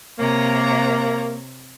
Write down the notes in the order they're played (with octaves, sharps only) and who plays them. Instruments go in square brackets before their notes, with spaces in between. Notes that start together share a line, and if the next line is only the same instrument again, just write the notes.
[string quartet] C3 C#5 A#5 [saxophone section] A#3